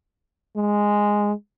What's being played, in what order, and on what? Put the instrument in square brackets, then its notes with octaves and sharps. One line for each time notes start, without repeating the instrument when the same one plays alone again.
[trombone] G#3